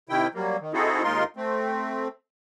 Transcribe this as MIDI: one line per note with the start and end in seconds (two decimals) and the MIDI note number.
0.09 0.27 48
0.09 0.27 51
0.09 0.27 64
0.09 0.27 79
0.35 0.57 54
0.35 0.57 55
0.35 0.57 58
0.61 0.72 51
0.74 1.03 60
0.74 1.03 63
0.74 1.03 64
0.74 1.03 66
0.74 1.03 68
0.74 1.03 69
1.03 1.24 39
1.03 1.24 56
1.03 1.24 63
1.03 1.24 65
1.03 1.24 70
1.03 1.24 84
1.37 2.08 57
1.37 2.08 60